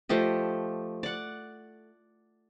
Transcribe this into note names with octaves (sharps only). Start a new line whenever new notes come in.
F3 A3 G4 D#5
D5 F#5